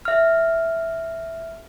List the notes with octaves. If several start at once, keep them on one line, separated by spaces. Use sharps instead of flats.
E5 F6